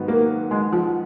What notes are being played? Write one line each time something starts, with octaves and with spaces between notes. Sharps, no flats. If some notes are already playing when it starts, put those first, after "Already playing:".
Already playing: G#2 D#3 F#3 B3
A#3
G#3
F3